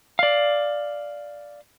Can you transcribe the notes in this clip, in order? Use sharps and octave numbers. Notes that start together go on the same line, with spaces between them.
D5 F5